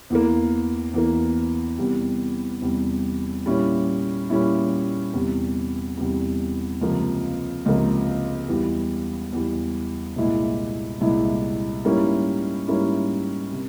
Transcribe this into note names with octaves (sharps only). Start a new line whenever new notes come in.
E2 E3 A#3
E2 E3 A#3
E2 C3 G3
E2 C3 G3
A#2 G3 C#4 E4
A#2 G3 C#4 E4
E2 C3 G3
E2 C3 G3
C#2 C3 F3 A#3
C#2 C3 F3 A#3
E2 E3 G3
E2 E3 G3
C2 A#2 G#3 E4
C2 A#2 G#3 E4
G#2 G3 A#3 C#4 E4
G#2 G3 A#3 C#4 E4
C3